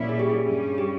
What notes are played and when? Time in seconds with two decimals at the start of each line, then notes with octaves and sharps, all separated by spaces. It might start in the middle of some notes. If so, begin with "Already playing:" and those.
Already playing: A#2 G3 C#4 E4
0.09 G#4
0.19 G4
0.30 G#4
0.44 G2 G3 C#4
0.78 G4